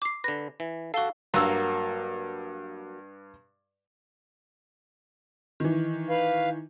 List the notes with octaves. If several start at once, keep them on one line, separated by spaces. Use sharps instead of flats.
D6 C7
D3 B4 A#6
E3
F#4 A4 F5 G7
G2 F#3 A#3 E6
D#3 E3
B4 F5